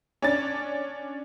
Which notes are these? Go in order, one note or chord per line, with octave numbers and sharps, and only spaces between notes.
C#4 D4 A6